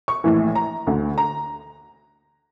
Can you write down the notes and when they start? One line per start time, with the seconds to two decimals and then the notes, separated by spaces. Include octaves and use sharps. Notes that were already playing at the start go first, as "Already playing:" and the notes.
0.08 C#6
0.24 A#1 A2 E3
0.55 A#5
0.87 D2 D3
1.18 A#5